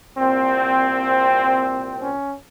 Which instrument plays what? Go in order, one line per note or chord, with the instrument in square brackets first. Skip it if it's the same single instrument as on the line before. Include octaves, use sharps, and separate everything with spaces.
[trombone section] C2 A#2 C4
C#4